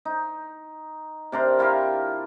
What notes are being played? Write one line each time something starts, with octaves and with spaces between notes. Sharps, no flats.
D#4
C3 D4 A#4 C6
E4 F4 G4 A#4